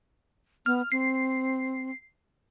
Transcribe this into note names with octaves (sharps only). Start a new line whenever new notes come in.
B3 F6
C4 C7